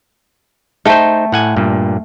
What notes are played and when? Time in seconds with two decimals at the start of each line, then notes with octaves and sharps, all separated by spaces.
0.85 A3 D#4 C5 G5
1.32 A2 F#5 G#5
1.56 G2 A#2